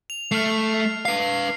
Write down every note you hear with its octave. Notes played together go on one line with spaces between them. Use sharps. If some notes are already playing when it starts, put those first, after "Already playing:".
F7
A3 F6 C7
B4 F5 C7